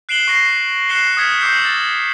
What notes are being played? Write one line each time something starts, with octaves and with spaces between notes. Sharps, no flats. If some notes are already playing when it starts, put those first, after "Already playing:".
F#6 C7 D7 E7 F#7 G7
C#6 A#6 C7
F#6 C7 C#7 E7 G7
D#6 F6 G#6 B6 C#7 E7
D6 E6 G6 C7
A6